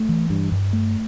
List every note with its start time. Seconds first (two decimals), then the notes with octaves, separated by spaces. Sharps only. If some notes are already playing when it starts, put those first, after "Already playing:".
Already playing: A3
0.09 E3
0.30 G2
0.52 G2
0.73 A3